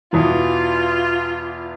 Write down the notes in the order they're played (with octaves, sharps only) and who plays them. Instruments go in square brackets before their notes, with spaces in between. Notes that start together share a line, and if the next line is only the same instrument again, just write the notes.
[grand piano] E2 B2 E3 [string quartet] F4